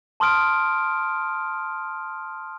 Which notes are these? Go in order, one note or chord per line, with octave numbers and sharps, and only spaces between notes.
A5 C6 D#6 F6 D7